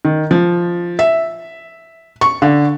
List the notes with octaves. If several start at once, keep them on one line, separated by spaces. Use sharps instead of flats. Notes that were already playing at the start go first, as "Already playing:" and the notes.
D#3
F3
E5
C#6
D3